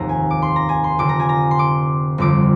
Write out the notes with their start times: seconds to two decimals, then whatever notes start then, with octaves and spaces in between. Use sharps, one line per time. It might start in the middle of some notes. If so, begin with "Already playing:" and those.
Already playing: F1 D#2 G#2 D#3 D#4 A#5
0.09 G#5
0.31 D6
0.42 C6
0.56 A#5
0.69 G#5
0.84 C6
0.99 F1 F2 D3 D6
1.09 A#5
1.20 G#5
1.29 A#5
1.51 C6
1.59 D6
2.18 G1 F2 D3 D6